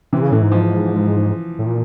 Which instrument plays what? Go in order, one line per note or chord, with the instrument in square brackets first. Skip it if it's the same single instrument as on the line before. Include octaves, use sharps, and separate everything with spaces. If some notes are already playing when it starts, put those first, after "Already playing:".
[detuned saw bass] C3 [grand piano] E3
[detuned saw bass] C#3
[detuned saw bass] A2 [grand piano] E3
[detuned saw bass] G#2
[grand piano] F3
[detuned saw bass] A2
A#2